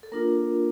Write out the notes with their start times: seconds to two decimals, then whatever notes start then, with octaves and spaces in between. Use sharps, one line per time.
0.03 A4
0.12 A#3 D4 F4 A#4